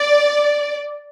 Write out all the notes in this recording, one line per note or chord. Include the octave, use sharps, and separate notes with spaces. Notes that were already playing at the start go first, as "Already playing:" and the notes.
Already playing: D5